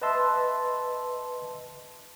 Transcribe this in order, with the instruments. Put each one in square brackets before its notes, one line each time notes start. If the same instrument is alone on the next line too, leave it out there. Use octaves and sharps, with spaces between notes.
[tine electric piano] B4 D#5 E5 A5 C6 E6